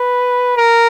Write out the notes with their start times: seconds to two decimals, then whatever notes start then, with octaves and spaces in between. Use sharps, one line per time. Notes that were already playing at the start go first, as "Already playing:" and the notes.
Already playing: B4
0.57 A#4